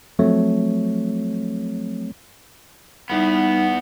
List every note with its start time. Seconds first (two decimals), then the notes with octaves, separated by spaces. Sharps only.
0.19 F3 F#3 A3 C4 C#5
3.10 E2 G3 B3 D#4 F#5